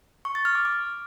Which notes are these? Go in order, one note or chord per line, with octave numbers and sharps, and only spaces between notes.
C#6
A6
F6
D6
D6